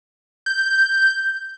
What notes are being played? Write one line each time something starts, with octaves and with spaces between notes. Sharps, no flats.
G6